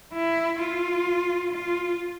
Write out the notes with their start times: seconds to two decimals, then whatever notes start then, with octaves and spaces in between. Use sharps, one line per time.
0.13 E4
0.60 F4
1.53 F4